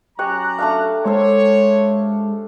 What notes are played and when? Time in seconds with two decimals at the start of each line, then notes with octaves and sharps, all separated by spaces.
0.19 F#3 C#4 G4 G#5 A#5 C#6 F#6
0.58 A3 D4 F5
1.05 G#3 A4 C5 C#5